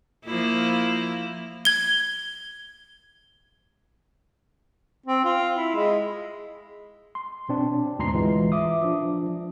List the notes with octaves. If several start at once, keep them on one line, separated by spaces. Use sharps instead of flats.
F3 A#3 E4
G#6 G7
C4
F4
E4
G#3
C6
B2 C4 D4
D2 G#2 B2 A#5 C6 C7
E3 G#3 F4
E5 D6 D#6
F3 D4 F4